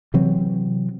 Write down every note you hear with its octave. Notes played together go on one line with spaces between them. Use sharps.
C3 E3 F#3 C4